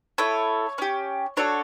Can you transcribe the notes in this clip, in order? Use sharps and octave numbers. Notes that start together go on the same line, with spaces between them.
A3 E4 A4 C#5
C#4 G4
D4 F#4 A4 C#5